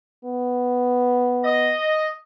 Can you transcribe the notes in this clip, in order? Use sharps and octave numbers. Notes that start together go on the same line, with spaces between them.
B3
D#5